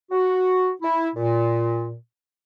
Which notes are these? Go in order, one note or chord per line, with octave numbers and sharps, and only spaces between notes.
F#4
E4
A#2